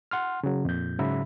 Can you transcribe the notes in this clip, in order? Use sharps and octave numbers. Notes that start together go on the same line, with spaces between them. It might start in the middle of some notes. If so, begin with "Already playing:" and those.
F#5 C6 F6
C#3 F#3
F2 A#2 G6
G#2 C#3 F#3 E5 B5